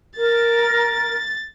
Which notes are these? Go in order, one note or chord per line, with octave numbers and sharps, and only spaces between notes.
A#4 A6